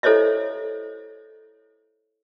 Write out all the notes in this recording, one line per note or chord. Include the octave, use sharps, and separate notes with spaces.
E4 A4 C5 C#5 D#5 E5